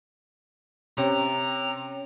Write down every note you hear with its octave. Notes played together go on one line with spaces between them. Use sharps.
C3 C#4 C#5 G5 A#5